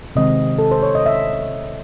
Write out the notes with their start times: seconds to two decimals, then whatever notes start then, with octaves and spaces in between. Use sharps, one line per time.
0.15 C3 D#3 G#3 C4 D#5
0.59 A4
0.71 C5
0.83 C#5
0.95 D#5
1.06 E5